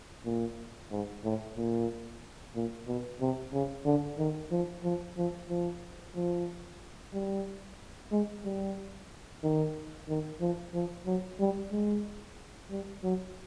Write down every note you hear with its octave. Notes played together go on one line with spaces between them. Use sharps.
A#2
G#2
A2
A#2
A#2
B2
C3
C#3
D3
D#3
F3
F3
F3
F3
F3
G3
G#3
G3
D#3
D#3
F3
F3
F#3
G3
G#3
G3
F#3